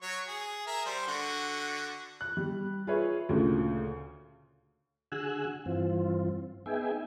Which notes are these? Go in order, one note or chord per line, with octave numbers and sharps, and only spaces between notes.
F#3 C#5 C#6
G#4
G#4 A#4 E5
G3 C5
D3 F#4
F#6
G3
F4 G#4 B4 C#5 E5
D2 A#2 C#3
D3 F#4 G#4 G#5 E6 F#6
G2 E3 C4 F4
B3 D#4 G#4 E5 G5 G#5